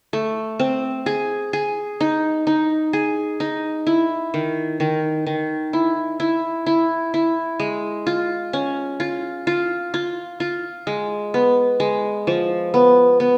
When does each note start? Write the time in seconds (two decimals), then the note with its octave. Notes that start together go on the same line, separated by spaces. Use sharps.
0.13 A3
0.59 C4
1.06 G#4
1.53 G#4
2.01 D#4
2.47 D#4
2.93 G#4
3.40 D#4
3.87 E4
4.34 D#3
4.80 D#3
5.27 D#3
5.73 E4
6.20 E4
6.66 E4
7.14 E4
7.60 G#3
8.07 F4
8.53 C#4
9.00 F4
9.47 F4
9.94 F4
10.40 F4
10.87 G#3
11.34 B3
11.80 G#3
12.27 F3
12.74 B3
13.20 B3